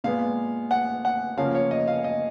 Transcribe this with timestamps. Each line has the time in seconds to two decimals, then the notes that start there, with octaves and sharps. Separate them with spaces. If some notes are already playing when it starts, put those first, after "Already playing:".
0.04 A#2 G#3 B3 F5
0.71 F#5
1.05 F#5
1.37 C#3 F3 A#3 C#4 F5
1.55 C#5
1.71 D#5
1.88 F5
2.04 D#5